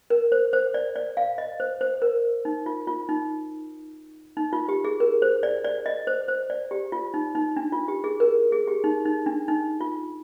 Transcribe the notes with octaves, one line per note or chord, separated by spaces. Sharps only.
A#4
C5
C5
D5
D5
F5
D#5
C5
C5
A#4
D#4
F4
F4
D#4
D#4
F4
G4
G#4
A#4
C5
D5
D5
D#5
C5
C5
D5
G4
F4
D#4
D#4
D4
F4
G4
G#4
A#4
G#4
G4
D#4
D#4
D4
D#4
F4